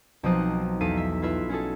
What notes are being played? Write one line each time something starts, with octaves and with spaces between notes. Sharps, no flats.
B1 F3 C4 D#4 D#6 F#6
E2 D#4 A4 F5 B6 D#7
E5
E4 F4 B4 E5
C#4 E4 F#4 G#4 A4